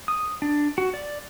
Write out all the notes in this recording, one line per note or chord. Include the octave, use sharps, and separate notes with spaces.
D#6
D4
F#4
D5